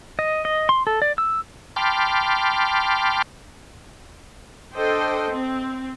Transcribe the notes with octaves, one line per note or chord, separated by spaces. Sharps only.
D#5
D#5
C6
A4
D5
E6
G5 A5 B5 C6 D6 F6
D4 A4 C5 D#5 G5
C4